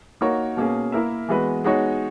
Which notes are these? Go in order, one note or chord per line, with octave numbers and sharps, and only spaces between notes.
A#3 D#4 F#4 A#4 C#5
B2 A#3 C#4 G#4
A#3 E4 A#4 E5
E3 G#3 B3 F#4 B4
G#3 B3 D#4 F#4 C#5